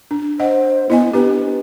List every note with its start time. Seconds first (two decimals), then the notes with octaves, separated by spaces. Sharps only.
0.11 D4
0.40 C5 D#5 F#5
0.90 B3 E4 D#5 G#5
1.13 B3 D4 G4 B4